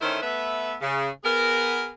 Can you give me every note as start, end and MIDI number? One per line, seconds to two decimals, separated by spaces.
0.01 0.18 50
0.01 0.18 51
0.01 0.18 57
0.01 0.18 61
0.01 0.18 64
0.01 0.18 72
0.22 0.74 57
0.22 0.74 59
0.22 0.74 71
0.22 0.74 76
0.81 1.09 49
1.24 1.91 59
1.24 1.91 68
1.24 1.91 70